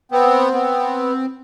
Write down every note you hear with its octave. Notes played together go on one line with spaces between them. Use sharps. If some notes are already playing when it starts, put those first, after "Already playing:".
B3 C4
B3